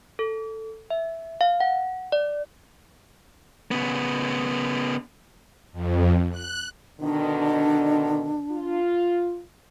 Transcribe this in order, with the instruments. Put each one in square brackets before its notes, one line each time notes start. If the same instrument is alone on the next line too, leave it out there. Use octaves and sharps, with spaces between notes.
[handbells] A4
E5
F5
F#5
D5
[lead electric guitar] C#3 B3
[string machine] F2
F#6
[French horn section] B2 D3 D#3 [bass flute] D4
[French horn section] F4